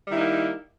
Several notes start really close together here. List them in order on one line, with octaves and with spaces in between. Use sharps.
G3 D#3 E4 D#4 A#3